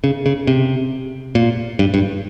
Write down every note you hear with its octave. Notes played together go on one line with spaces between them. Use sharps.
C#3
C#3
C3
A#2
G2
G2